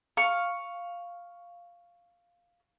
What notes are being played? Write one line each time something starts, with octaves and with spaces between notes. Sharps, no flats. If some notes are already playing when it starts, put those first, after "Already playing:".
F5 C#6